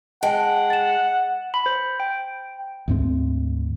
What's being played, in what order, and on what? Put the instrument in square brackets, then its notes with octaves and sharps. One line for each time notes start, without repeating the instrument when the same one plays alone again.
[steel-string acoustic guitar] G#3 [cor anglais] F#5 [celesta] G5 A5 D7
[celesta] A6 E7
[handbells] B5
C5
G5
[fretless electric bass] D2 G#2 C4